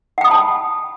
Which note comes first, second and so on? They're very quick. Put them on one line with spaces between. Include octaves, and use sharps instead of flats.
F#5 G5 D#6 B5 A5